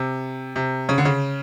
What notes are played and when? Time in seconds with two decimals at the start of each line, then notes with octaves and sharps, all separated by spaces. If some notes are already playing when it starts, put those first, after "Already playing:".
Already playing: C3
0.56 C3
0.89 C#3
0.98 D3
1.05 C#3